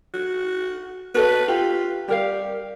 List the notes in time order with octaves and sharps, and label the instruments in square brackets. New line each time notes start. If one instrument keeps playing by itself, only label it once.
[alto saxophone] F#4
[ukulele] F#4 A4 D#5 [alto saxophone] B4
[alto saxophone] F4 [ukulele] G4
[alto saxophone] G3 [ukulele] G4 A#4 F5